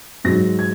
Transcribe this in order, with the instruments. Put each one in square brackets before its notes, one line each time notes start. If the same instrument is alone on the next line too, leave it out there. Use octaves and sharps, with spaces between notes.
[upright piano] G#2 F#3 A#6
G#6